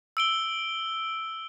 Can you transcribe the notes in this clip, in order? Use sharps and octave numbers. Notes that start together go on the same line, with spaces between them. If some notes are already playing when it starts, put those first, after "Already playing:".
E6 D7 G7